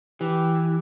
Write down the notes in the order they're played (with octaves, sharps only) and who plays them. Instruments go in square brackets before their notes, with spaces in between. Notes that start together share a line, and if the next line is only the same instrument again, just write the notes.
[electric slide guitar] E3 [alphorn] G4